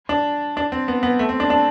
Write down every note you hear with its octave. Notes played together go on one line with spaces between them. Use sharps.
D4
D4
C4
B3
B3
A3
C4
D4
D4